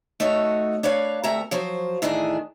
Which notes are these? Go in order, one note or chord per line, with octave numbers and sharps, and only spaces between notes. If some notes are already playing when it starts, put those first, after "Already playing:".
A3 D#4 F#4 C#5
D4 B4 C#5 F5
D2 C3 A3 A#4 E5 A#5
F3 F#3 C5
A2 D#3 E3 D4 G#4